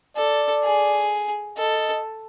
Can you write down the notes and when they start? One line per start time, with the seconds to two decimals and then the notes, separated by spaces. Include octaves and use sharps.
0.17 A4 D5
0.64 G#4
1.58 A4 D#5